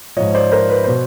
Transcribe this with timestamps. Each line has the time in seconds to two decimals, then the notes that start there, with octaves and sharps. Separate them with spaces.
0.16 G#2 F3 C#5 D#5
0.34 C5 D5
0.52 A#4 C5
0.70 B4
0.84 B2 C5